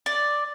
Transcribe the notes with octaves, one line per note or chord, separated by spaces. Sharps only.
D5